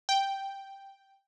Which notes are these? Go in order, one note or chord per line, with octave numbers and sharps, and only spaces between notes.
G5